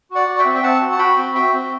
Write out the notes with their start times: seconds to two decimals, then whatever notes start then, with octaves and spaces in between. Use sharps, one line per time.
0.10 F#4
0.15 D5 F#5
0.28 F#4
0.39 E5 G5
0.45 C4
0.56 G5
0.63 C4 F#5 A5
0.81 F#4
0.92 A5
0.98 F#4 G5 B5
1.17 C4
1.35 F#4 E5 G5
1.53 C4